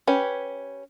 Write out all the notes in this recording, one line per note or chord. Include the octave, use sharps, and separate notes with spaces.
C#4 G4 B4